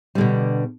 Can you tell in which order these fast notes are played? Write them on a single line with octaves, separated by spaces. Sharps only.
G3 D3 B2